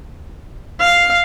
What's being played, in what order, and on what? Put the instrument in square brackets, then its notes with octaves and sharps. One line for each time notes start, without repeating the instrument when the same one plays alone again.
[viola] F5